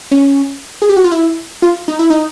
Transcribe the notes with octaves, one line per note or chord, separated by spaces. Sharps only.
C#4
G#4
G4
F#4
F4
E4
F4
D#4
E4
D#4